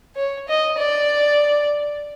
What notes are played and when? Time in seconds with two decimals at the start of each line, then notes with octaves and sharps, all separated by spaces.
0.16 C#5
0.48 D#5
0.78 D5